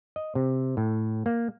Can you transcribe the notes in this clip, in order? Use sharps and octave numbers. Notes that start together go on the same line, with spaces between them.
D#5
C3
A2
A#3